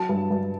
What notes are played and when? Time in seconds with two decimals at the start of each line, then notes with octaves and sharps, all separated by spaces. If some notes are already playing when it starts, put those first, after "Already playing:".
Already playing: F#3 A5
0.09 G2
0.30 G2